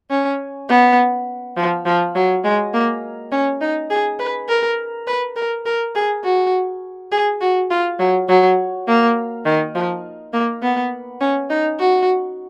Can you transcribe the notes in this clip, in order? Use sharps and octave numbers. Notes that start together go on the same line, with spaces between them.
C#4
B3
F3
F3
F#3
G#3
A#3
C#4
D#4
G#4
B4
A#4
B4
A#4
A#4
G#4
F#4
G#4
F#4
F4
F#3
F#3
A#3
D#3
F3
A#3
B3
C#4
D#4
F#4